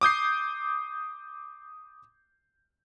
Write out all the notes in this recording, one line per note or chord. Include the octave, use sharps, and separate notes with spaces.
D6 D#6 G6 C7